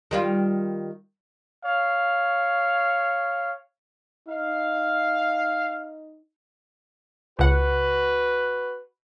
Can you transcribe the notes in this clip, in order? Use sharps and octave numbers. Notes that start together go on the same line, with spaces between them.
D#3 G3 F4
C#5 F5
D#4 F5
C#2 F#4 B4 F#5